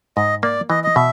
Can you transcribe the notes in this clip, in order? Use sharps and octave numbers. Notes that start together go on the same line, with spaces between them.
G#2 D#5
A#3 D5
E3 D#5
D#5
B2 E5